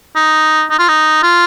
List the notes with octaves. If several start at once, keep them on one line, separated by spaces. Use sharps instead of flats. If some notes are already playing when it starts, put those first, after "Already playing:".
D#4
D#4
F4
D#4
F4